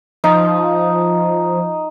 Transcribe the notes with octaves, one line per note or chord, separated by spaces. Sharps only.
F3 D#4